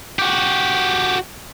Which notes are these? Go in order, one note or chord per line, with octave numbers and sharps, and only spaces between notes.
F#4 G4